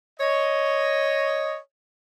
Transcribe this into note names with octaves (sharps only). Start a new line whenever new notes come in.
C#5 D#5